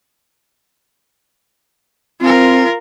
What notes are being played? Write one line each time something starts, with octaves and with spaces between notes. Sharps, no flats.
C4 F4 A#4